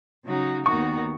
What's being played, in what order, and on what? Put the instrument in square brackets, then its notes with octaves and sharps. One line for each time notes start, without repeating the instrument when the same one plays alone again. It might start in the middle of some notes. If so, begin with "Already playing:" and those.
[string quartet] C#3 F#3 D#4 F#4
[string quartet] D#2 D#3 B3 D#4 F#4 [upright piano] C#6